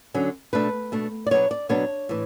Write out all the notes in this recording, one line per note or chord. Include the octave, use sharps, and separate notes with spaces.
D3 F#3 C#4
B2 A3 D4 B4
B2 A3 D4
D5
B2 F#3 B3 D4 C#5
D5
B2 F#3 B3 D4 C#5
A2 E3